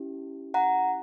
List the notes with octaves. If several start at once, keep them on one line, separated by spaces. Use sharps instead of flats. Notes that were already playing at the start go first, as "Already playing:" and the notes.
Already playing: C#4 E4 G4
F#5 A#5